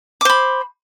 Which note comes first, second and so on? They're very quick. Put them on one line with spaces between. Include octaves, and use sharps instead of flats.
D6 C5 B5